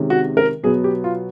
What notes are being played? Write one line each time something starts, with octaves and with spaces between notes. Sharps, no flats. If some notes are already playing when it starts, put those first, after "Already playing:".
Already playing: C3 D#3 G#3 C#4
F#4
A#4
B2 F#3 B3 G#4
G4
F4